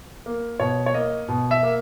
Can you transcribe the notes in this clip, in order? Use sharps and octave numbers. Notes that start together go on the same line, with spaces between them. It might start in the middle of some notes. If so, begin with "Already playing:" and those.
A#3
B2 C#5
C#5
A#3 D#5
B2
E5
A#3